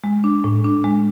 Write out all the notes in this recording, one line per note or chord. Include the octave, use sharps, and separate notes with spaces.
G#3
D4
A2
D4
G#3